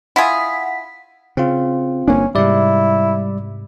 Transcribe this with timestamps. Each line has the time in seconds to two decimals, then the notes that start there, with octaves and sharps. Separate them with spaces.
0.16 E4 F4 G#4 F#5 B6
1.37 C#3 C4 F4
2.08 G1 A#3 C#4 D4
2.35 G#2 C3 G3 E4 D5